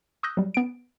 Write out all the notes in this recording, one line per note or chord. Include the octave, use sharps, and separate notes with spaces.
C#6 D#6 E6 F#6 G6 A#6
F#3 G3
B3 D7